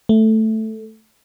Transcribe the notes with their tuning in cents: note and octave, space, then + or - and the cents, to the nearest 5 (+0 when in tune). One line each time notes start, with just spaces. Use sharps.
A3 +0